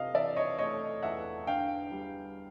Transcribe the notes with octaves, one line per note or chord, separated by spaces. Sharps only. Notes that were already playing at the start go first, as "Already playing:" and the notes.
Already playing: C3 D#5 F5
E3 D5 E5
C#5 D#5
A3 C#5 D#5
E2 E5 F#5
D3 F5 G5
G3